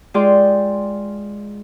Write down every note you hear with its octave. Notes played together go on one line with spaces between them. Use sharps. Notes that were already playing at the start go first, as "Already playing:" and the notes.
G#3 F4 G#4 D5 G5 C6